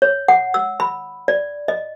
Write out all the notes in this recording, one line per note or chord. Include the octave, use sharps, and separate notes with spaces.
C#5
F#5
E6
B5
D5
D#5